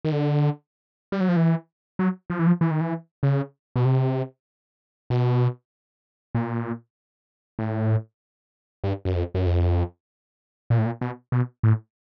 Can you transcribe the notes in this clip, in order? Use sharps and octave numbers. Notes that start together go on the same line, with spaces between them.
D#3
D3
G3
F#3
F3
E3
F#3
F3
E3
F3
E3
D#3
E3
C#3
B2
C3
B2
A#2
A2
G2
F#2
F2
F#2
F2
A#2
A2
A#2
B2
B2
A2